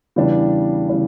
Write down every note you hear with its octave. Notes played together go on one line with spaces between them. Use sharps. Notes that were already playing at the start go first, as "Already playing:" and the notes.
E2 C#3 E3 G3 D4
C#3 E3 G3 D4